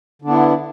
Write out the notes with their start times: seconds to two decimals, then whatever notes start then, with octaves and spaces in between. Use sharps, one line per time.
0.22 D3
0.25 D4
0.27 B3
0.30 E4